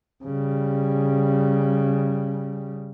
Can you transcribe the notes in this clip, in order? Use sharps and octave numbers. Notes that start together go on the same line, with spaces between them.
C#3 G3